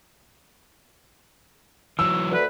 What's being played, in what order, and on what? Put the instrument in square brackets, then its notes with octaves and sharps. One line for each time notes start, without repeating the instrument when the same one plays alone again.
[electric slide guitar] E3 F#3 [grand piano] E6
[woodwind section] D2 B4